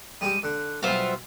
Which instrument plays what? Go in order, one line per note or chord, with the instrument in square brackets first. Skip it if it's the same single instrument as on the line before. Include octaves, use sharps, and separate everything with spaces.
[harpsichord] G3 G#3 G4 [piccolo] D#7
[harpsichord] D3 [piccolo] F#6
[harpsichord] B1 G3 [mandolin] F4 C5 E5 [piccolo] F#5